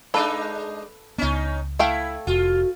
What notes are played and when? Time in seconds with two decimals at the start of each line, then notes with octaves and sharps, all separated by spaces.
0.14 G#3 D4 D#4 A4 B4 F5
1.18 C#2 B3 C#4 D#4
1.79 A3 E4 F5 G5
2.27 F1 F4 F#4